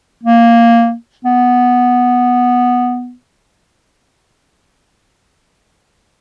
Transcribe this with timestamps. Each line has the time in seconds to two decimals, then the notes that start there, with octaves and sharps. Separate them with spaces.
0.23 A#3
1.25 B3